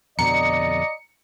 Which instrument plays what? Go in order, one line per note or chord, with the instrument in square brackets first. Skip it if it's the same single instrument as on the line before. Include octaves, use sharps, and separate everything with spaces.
[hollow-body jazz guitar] F2 B2 D3 [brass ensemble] D5 D#5 [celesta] A#5 [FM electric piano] C#7